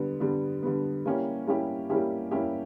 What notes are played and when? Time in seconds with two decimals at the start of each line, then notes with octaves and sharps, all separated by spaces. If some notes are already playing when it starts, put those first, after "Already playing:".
Already playing: D3 G3 B3
0.20 D3 G3 B3
0.62 D3 G3 B3
1.05 G3 A#3 C#4 E4 G4
1.47 G3 A#3 C#4 E4 G4
1.90 G3 A#3 C#4 E4 G4
2.31 G3 A#3 C#4 E4 G4